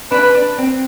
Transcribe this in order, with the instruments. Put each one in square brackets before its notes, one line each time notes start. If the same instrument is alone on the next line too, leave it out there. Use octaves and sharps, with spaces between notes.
[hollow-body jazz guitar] D4 [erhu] B4
[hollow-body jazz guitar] D4
C4